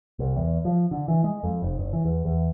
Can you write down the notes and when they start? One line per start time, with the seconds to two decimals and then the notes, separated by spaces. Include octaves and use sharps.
0.19 C2
0.36 E2
0.65 F3
0.91 D3
1.08 E3
1.24 G#3
1.43 F2
1.62 F1
1.79 F#1
1.93 E3
2.05 E2
2.25 E2